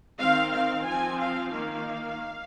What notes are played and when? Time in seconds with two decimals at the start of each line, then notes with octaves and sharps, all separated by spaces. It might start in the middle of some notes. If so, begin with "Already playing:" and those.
0.19 D#3 C4 F5
0.53 F5
0.85 F3 C4 G#5
1.19 F5
1.51 D#3 A#3 F5